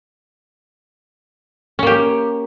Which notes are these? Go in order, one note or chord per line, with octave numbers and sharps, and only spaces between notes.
A#3 C#4 G4